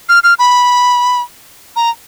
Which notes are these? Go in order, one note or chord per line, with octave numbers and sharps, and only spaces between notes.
F6
F6
B5
A#5